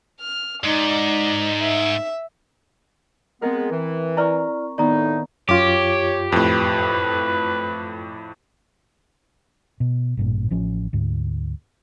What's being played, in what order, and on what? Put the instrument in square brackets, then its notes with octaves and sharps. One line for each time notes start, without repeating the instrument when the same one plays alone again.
[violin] F6
[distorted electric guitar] G#2 [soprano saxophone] D#4 [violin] D5
[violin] E5
[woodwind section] G#3 B3 [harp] C4 A#4
[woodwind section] E3
[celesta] E4 D5 F6 [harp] A#5 C#6
[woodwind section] A2 D#4 [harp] D#3 B3 [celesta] D5 A#5
[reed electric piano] F#2 F4 [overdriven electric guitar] G4 [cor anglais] C#5 [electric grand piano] D6
[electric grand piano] F2 A2 [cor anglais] B4
[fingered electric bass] B2
A1 G2 A#2
A1 F3 C#4
D2 G#2